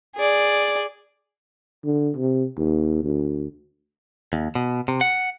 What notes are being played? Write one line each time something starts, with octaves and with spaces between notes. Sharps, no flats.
G#4 D5
D3
C3
D#2
D2
D#2
B2
C3
F#5